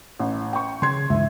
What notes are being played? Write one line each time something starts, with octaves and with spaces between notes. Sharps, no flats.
A1
G5 C#6
C#3 C6 G#6
C#2 G2 E3 E5